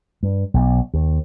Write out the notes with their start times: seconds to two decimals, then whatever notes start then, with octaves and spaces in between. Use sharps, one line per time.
0.23 G2
0.54 B1
0.94 D#2